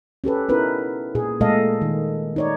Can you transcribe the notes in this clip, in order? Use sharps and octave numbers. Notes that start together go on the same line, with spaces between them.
C#4 G4 A4 B4
B3 C#4 D#4 E4 A#4 B4
A#2 G#4
A#2 G#3 A3 A4 D#5 F5
D#3
D#4 C#5 D5